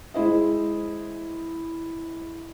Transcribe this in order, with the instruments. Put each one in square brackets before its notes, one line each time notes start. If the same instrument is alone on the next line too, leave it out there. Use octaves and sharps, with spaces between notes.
[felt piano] G#3 E4 C5 D#5